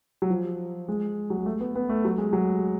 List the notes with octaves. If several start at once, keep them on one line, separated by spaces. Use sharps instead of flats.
F#3
F3
G#3
F#3
G#3
A3
B3
B3
A3
F#3
G#3
F#3